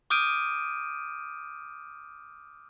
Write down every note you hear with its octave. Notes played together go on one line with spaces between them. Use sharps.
D6 D#6 F6 G6 D7 D#7